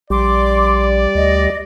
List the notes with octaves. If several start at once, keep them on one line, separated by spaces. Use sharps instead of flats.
A#1 G3 D5 C6 D6
D2 D#5